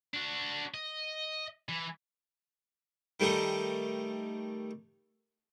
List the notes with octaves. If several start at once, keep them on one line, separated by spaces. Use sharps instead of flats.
D4 F#4
D#5
E3
D#3 G3 A3 D#4